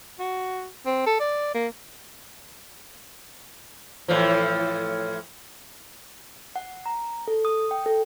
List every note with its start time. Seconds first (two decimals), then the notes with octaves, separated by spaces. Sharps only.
0.19 F#4
0.86 C4
1.06 A4
1.20 D5
1.54 A#3
4.08 A2 E3 F3
6.56 F#5
6.86 A#5
7.28 A4
7.45 D#6
7.71 G5
7.86 A4